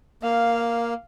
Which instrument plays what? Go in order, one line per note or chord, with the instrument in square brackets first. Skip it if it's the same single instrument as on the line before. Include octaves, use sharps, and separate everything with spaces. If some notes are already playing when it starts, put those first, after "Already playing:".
[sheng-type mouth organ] A#3 [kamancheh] F5